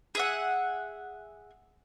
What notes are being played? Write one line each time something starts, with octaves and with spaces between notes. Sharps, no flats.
G#4 E5 F#5